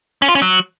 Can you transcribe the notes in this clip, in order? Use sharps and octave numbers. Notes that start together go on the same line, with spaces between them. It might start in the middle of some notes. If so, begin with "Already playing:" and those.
C#4
F4
C#4
F#3